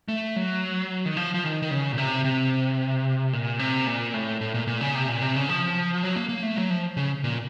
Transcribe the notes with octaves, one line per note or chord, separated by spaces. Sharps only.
A3
F#3
D#3
F3
F3
D#3
D#3
C#3
A#2
C3
C3
A#2
C3
A#2
A2
A2
A#2
A#2
C#3
C3
A#2
C3
C#3
F3
F#3
A#3
A#3
A3
F#3
F3
C#3
A#2